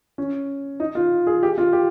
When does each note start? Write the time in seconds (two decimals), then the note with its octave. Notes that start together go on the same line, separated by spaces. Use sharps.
0.18 C#4
0.80 D#4
0.95 F4
1.27 G#4
1.43 G4
1.58 F4
1.73 G4